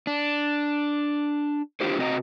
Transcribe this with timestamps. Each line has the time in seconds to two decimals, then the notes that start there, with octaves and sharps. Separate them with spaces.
0.07 D4
1.80 D4 E4 F4 G4 C5
1.98 C3 C4 F#4 D#5 G5 A#5